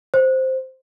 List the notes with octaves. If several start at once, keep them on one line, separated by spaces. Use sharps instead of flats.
C5